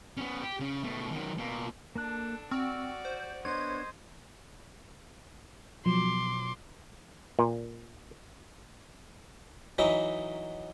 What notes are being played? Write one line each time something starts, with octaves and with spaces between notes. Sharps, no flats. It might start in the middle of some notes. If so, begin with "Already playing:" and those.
B3 C#4
G4
C#3
B2 A3
D#3 F#3
B2 A#3
A#3 D4 A4 A5 F#6
C4 F#4 D5 C#6 E6 F6
C5
B3 D4 C5 C#5 D#5 G#6
B2 F3 F#3 C6 D6
A#2
E3 F#3 D#4 E5